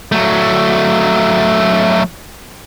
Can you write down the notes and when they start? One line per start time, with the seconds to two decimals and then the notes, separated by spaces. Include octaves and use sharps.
0.12 F#3 A3